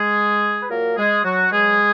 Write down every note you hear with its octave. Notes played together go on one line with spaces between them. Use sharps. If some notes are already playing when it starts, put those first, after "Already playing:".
Already playing: G#3 G#4
B4
A#2 F#3 A#3 A#4
G#3 G#4
F#3 F#4
B2 F#3 G#3 G#4